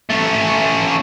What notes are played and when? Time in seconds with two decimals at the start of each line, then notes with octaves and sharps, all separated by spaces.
0.09 A3 C#4